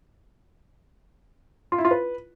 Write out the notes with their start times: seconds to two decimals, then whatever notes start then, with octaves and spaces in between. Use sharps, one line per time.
1.72 F4
1.78 E4
1.85 F4
1.91 B4